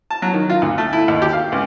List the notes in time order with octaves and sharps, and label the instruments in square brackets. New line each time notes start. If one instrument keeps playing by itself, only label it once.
[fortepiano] A5
F#3
D#3
F4
D2
A3
E4
D#2
G4
F5
C#2